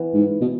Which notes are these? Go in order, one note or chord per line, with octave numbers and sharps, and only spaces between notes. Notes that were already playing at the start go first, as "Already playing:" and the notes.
Already playing: E3 B3
G#2
B2